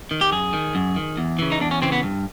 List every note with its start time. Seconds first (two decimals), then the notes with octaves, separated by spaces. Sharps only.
0.11 D#3
0.21 G4
0.32 F#2 G#4
0.53 D#3
0.75 F#2
0.96 D#3
1.17 E2
1.39 C#3 E3
1.52 D#4
1.60 E2 D4
1.71 C#4
1.82 C#3 E3 C4
1.92 B3
2.03 G2